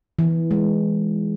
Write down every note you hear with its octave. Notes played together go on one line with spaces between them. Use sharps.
E3
G#3